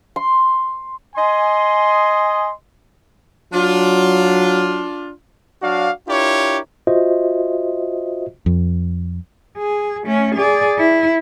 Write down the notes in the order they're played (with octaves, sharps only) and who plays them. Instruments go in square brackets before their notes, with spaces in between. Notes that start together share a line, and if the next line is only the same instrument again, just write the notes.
[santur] C6
[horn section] D#5 G#5 C6
[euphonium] F#3 [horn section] D4 F4
[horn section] F#3 D4 F#4 D5 F5
D4 E4 F4 G4 A#4 C#5
[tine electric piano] F4 F#4 C5 D#5 E5
[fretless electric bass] F2
[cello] G#4
A3 C#4
G#4 D5
E4